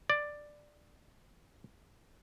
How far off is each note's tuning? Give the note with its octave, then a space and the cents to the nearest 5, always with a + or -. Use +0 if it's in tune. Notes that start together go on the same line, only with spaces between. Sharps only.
D5 +10